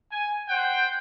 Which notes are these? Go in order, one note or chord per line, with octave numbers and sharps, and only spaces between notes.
G#5
C5 F#5 G5